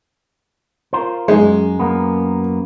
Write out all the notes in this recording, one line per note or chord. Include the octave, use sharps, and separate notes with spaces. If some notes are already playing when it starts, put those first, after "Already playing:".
F4 A#4 C5
F#2 G#3
F#2 A#3 B3